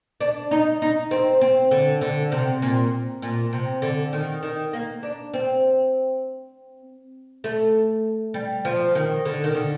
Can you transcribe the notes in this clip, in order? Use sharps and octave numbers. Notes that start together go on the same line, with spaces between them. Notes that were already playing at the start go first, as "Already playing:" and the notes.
D4
D#4
D#4
C4
C4
D3
D3
C3
A#2
A#2
C3
D3
D#3
D#3
A#3
D4
C4
A3
G3
F3
D#3
D3
D#3
D3